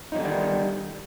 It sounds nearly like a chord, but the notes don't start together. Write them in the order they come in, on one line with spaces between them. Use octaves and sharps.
D#4 F#3 D3 G3 D#3